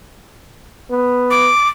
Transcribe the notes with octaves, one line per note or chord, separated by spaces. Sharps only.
B3
D6